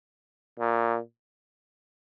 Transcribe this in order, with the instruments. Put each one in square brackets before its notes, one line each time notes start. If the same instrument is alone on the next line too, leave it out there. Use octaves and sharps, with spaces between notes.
[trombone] A#2